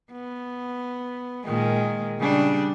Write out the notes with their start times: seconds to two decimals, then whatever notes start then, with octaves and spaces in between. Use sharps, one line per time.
0.12 B3
1.45 A#2 D#3 G#3
2.19 C#3 G3 D4